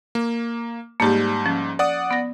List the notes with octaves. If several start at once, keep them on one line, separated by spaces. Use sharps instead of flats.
A#3
G#2 G3 A#3 G4 A5
F3 C#4
D5 F#5 D#6
B3 A#6